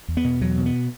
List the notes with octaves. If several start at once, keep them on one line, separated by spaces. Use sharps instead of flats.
E2
B3
B2
E2 F#3
B2
B3